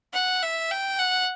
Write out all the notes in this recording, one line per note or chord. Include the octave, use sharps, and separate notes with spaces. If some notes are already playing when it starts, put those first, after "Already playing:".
F#5
E5
G5
F#5